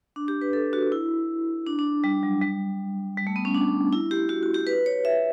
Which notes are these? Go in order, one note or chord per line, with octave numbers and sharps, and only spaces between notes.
D4
G4
B4
A4
F#4
E4
D4
D4
G3
F#3
G3
G3
A3
B3
C#4
D4
E4
G4
F#4
F#4
G4
B4
C#5
E5